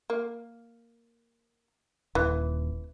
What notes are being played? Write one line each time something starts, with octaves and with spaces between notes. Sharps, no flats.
A#3
D#1 E3